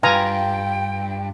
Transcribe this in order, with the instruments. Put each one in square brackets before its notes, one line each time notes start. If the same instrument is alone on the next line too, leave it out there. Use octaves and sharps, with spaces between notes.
[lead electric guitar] B1 G2 [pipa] F4 [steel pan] B4 G#5 A#5 [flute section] G5